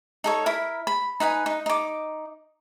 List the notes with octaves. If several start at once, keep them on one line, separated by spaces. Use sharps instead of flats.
D#4 A4 C#5
E4 A#4 B5
B5
D#4 B4 F#5 G#5
D#4
D#4 D6